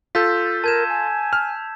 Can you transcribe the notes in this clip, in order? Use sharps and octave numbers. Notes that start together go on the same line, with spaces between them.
F4 A4 E6 G6 B6
A#4 A5 G#6 E7
G#5
F6